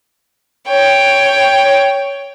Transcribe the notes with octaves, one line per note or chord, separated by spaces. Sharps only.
C#5 G5